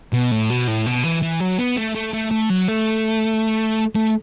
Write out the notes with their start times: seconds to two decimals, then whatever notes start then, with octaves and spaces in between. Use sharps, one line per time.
0.13 B2
0.31 A2
0.50 B2
0.67 A2
0.86 B2
1.04 E3
1.22 E3
1.40 F#3
1.59 B3
1.77 A3
1.95 A3
2.13 A3
2.31 A3
2.50 F#3
2.68 A3
3.95 A3